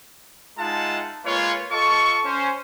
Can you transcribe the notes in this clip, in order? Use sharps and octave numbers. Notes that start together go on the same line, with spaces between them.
G#3 D#4 F4 E5 F#5 A5
G#3 A#3 F4 B4 C#5
F4 A4 D#5 A5 C#6
C#4 C5